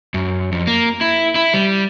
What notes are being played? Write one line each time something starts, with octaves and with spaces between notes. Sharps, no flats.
F#2
F2
A#3
E4
E4
G3